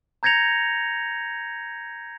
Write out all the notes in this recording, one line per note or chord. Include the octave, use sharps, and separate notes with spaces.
A#5 G6 G#6 A#6 C#7 F7